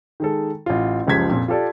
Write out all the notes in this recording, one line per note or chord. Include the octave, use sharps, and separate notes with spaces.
D#3 G#3 A4
A1 F4
F#1 C#2 F3 G4 G#6 B6
F2 A#2
F4 G4 A4 D5